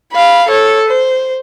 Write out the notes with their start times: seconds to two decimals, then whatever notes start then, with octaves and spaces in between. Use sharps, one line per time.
0.12 F5 B5
0.48 A4 C#5
0.86 C5